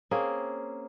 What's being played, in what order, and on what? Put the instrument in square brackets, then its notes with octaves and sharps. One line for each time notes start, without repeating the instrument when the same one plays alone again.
[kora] A#3 C4 C#4 G#4